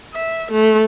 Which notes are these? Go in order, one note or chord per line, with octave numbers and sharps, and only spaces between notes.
E5
A3